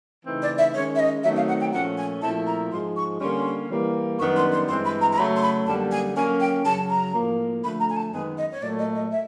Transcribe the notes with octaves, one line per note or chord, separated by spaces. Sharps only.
C#3 E3 A3 C4 D#4
D5
E5
D#3 G#3 C#4 C#5
E5
D#5
D#3 F#3 A3 C4 D#4 E5
F5
F#5
G5
A#2 F3 A3 C#4 F#5
G#5
A#2 F3 A3 C4 E4 A5
A#5
G#2 F3 G#3 C6
C#6
D3 G3 A#3 C#4 C6
E3 G3 A#3
F#2 D#3 G3 B3 D4 C#6
C6
C6
G2 E3 G#3 C4 C6
B5
A#5
A#5
C#3 F#3 A3 B5
C6
B5
F#2 D3 G3 A#3 A5
G#5
D3 F#3 A#3 C#4 G#5
G5
F#2 C#3 F#3 A5
A#5
A2 F3 A#3
D3 F3 A3 B5
A#5
G#5
A5
F#2 D#3 G#3 B3 G#5
D#5
C#5
A#2 F#3 A3 D5
D#5
D#5
E5